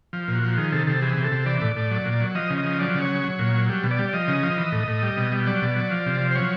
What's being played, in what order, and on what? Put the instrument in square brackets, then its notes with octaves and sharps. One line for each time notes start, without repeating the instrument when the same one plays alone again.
[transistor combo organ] F3
A#2
F#4
F3
D#3 G#4
C3 A4
C3 A4
E3 G#4
C3
A4
C3
E3 D5
A2
A2
F#3
A#2
F#3
F3 D#5
C#3
D#5
F3
F#3 D5
C#3
C#5
F#3
F#3
A#2
F#3
G3
B2
D5
G3
D5
F3 D#5
C#3
F3
E3
A2
A2
G3
B2
G3
F#3 D5
B2
F#3
F3
C3
F3
C5
F#3 C#5